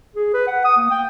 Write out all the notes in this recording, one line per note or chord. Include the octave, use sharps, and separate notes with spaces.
G#4
B4
F#5
D#6
A#3
G5